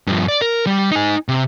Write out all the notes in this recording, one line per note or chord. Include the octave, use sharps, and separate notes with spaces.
G2 F3
D5
A#4
G3
D#4 G#5
C3